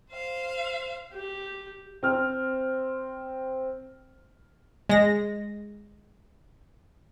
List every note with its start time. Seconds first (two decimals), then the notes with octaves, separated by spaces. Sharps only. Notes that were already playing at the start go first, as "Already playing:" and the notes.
0.11 C5 F5
1.13 G4
2.03 C4 F6
4.90 G#3 A#6